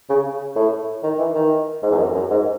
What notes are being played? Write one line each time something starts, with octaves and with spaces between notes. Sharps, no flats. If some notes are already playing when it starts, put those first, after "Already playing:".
C#3
A2
D#3
E3
D#3
G#2
E2
F#2
F#2
G#2